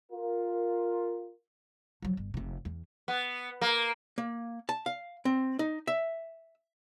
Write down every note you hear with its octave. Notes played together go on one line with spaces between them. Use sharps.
F4 A#4
F3 F#3
G1
F1 C3
E2
B3
A#3
A#3
A5
F5
C4
D#4
E5